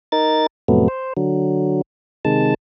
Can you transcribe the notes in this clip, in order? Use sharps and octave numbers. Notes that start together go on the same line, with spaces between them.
D#4 A#4 A6
F2 A2 C3 F#3 A3 B3
C5
D3 F#3
C3 D#3 G#3 A5